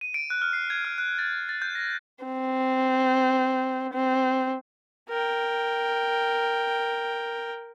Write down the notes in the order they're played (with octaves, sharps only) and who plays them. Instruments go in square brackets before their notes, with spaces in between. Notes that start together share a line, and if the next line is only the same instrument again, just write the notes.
[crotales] D#7
D7
F#6
F6
C7
G#6
F6
F#6
A6
A6
G6
A#6
[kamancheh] C4
C4
[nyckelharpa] A#4 G5